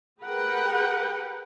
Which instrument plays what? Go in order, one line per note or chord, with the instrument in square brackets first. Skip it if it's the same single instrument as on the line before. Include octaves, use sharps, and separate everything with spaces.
[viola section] G4 G#4 A#4 B4 F#5 G5